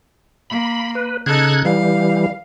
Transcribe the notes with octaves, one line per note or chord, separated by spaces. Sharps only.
A#3 B5
B4
C#3 D#4 A4 F#6 G#6
E3 G3 F5